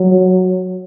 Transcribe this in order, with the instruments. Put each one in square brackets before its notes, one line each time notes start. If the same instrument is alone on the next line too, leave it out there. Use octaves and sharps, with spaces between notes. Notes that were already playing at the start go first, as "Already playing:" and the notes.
Already playing: [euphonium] F#3